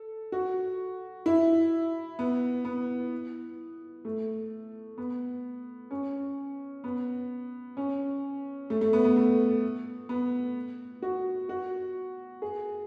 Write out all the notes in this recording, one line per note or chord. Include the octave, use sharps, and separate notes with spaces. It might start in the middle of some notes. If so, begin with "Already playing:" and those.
Already playing: A4
F#4
E4
B3
B3
A3
B3
C#4
B3
C#4
A3
A3
B3
B3
A3
B3
F#4
F#4
G#4